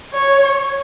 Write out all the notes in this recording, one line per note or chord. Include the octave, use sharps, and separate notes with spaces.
C#5